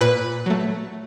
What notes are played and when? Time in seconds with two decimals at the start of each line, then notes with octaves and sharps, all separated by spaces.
0.01 A#2 B4
0.46 F#3 A3